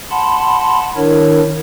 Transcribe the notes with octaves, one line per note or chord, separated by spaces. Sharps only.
F#5 A5 B5 C6
D#3 D4 E4 A#4 C#5